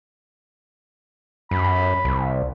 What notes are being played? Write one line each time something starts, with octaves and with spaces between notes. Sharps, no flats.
F#2 B5
C2